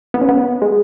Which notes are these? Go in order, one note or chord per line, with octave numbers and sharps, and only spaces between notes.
B3
C#4
B3
G#3